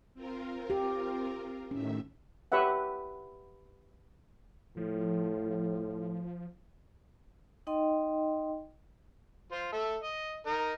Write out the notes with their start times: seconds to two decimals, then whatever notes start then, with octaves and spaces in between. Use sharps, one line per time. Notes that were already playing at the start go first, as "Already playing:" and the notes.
0.14 C4 F4 A#4
0.70 G4
1.71 A2 D#3 C#4 E5
2.52 G4 B4 C#5 E5 F#5
4.77 A2 F3
7.67 D#4 D#5 G5 C6
9.52 F4 C5
9.72 A4 E5
10.03 D#5
10.46 D#4 A#4